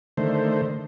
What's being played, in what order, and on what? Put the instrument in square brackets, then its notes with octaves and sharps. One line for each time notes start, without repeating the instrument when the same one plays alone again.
[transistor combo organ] D3 D#3 A3 C5